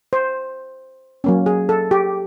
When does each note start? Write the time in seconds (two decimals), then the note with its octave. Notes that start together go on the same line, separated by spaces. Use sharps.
0.13 C5
1.24 F#3 A#3 C#4
1.46 G#4
1.69 A4
1.91 G4